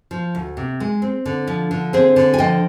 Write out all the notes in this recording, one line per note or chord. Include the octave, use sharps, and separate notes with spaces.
F3
D2
C3
G#3
C4
D3
F3
D3
C4 G#4 C5
D3
G#5
F3 D#5 G5